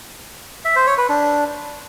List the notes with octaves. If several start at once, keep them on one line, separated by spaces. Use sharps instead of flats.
E5
C5
C#5
B4
D4